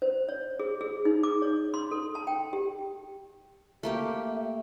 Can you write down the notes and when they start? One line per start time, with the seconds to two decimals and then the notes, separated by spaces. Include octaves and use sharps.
0.02 C5
0.29 C#5
0.59 G#4
0.81 G#4
1.05 D#4
1.23 D6
1.42 C#5
1.74 C6
1.91 A4
2.15 A5
2.27 G5
2.53 G4
3.83 A3 A#3 G4 E5